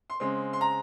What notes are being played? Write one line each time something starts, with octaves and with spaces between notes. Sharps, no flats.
C6
C#3 G#3 C4 C6
C6
A#5